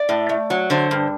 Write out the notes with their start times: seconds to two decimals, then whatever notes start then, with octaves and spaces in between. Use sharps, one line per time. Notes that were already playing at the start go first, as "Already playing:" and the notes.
Already playing: D5
0.09 A2
0.29 A3
0.50 F#3
0.70 D3 C5
0.91 G2